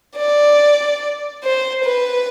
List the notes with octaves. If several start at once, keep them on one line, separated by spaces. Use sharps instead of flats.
D5
C5
B4